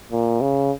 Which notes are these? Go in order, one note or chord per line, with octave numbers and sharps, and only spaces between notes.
A#2
C#3